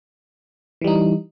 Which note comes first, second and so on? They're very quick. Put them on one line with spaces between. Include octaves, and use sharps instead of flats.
E3 G3 D#4